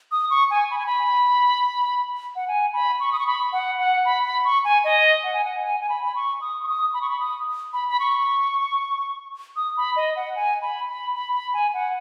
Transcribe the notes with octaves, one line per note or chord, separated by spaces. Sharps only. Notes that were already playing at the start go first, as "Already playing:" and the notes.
D#6
C#6
G#5
B5
G#5
B5
F#5
G#5
B5
C#6
D#6
C#6
B5
F#5
F#5
B5
B5
C#6
G#5
D#5
F#5
G#5
F#5
G#5
G#5
B5
B5
C#6
D#6
C#6
D#6
B5
C#6
B5
D#6
B5
B5
C#6
D#6
B5
D#5
F#5
G#5
B5
B5
B5
B5
G#5
F#5